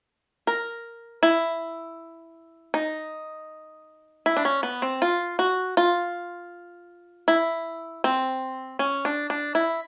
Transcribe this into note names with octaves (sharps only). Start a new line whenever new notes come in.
A#4
E4
D#4
E4
D4
C#4
B3
C4
F4
F#4
F4
E4
C4
C#4
D4
D4
E4